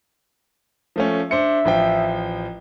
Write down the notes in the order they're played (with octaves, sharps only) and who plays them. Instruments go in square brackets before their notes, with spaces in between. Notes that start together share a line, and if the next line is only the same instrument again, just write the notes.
[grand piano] F3 A3 C#4
[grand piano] D4 C5 C#7 [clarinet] E5
[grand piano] A1 F3 G5